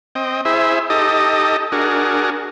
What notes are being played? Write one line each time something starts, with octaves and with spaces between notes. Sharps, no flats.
C4 D#5 G5
E4 G#4 C5 E5
D#4 G4 A4 D#5
D4 F#4 G#4 A#4